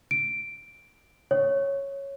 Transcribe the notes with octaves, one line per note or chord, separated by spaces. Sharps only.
D7
C#5